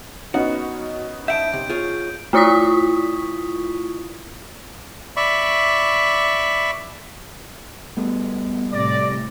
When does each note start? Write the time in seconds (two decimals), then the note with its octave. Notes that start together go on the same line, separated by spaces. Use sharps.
0.34 B3 C#4 D#4 F#4
1.28 E5 F#5 A5 G6 D7
1.53 C3
1.69 F4 G#4 C#5
2.33 A3 E4 F4 C#6 D#6 B6
5.16 D5 E5 B5 C#6
7.97 G3 A3 B3
8.73 A2 C3 D5 A#6